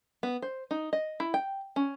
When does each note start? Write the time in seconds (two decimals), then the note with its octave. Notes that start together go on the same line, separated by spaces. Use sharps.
0.23 B3
0.42 C5
0.71 D#4
0.93 D#5
1.20 E4
1.34 G5
1.76 C#4